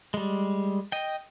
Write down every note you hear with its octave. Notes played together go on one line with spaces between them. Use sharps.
G3 G#3
D#5 G5